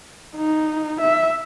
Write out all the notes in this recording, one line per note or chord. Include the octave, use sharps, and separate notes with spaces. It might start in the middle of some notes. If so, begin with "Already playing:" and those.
D#4
E5